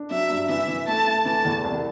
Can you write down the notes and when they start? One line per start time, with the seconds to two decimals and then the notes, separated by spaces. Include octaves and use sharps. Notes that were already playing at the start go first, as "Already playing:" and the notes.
Already playing: D4
0.11 F#3 E5
0.30 G2
0.49 E3 E5
0.68 E3
0.87 A3 A5
1.07 A3
1.25 E3 A5
1.45 E2
1.64 C2